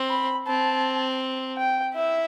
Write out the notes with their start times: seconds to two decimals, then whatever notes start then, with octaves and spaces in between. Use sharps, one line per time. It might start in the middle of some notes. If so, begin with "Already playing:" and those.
Already playing: C4
0.10 B5
0.47 C4 A5
1.57 G5
1.94 E4 E5